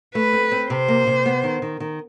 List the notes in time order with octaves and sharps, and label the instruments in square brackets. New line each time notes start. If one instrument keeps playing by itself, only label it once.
[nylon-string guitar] A3 [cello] B4
[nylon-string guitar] C4
C4
[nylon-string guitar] C3 [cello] C5
[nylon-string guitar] A#3
C3
B3
D#3
D#3
D#3